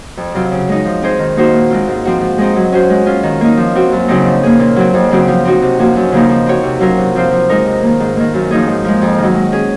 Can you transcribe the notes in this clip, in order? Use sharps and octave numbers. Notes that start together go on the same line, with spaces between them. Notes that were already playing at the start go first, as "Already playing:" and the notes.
F2
C3 F#3 C4 F4
C#3
G#3 D#4
F3
C4 D#4 G#4 C5
D#3
A#3 D#4 F#4 C5
A#2
G#3 C4 F4
G#2
F3 C4 F#4
F3
G#3 C4 D#4
F#3
C#4 F#4 C5
G#3
C#4 F4
D#3
A#3 D#4
F3
C4 F#4
F#2
C#3 F#3 C4 D#4
F3
A#3 C#4 G#4
A#2
F#3 C4 F#4
F2
C#3 F#3 C4 F#4
F3
C4 D#4 F#4
C3
F3 A#3 C#4 F#4
F#2
C#3 F3 A#3 D#4
F3
C4 F#4 C#5
C3
F#3 C#4 F4 A#4
C3
F3 C4 F4 C5
F3
G#3 D#4 A#4
C3
D#3 A#3
G#2
D#3 A#3
F#2
F3 A#3 D#4 G#4
G#2
F3 G#3
F2
D#3
F#3
G#3
C#4 G#4